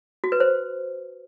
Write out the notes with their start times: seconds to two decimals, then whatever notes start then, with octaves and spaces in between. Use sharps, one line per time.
0.24 F#4
0.32 B4
0.40 C5